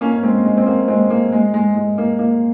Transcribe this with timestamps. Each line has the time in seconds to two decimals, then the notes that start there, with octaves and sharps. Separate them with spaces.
0.01 A#3 C#4
0.12 C#4
0.23 G#3 C4
0.45 G#3
0.57 C4
0.66 A#3
0.88 G#3 C4
1.10 A#3
1.32 G#3
1.54 G#3
1.76 G#3
1.98 A#3
2.19 A#3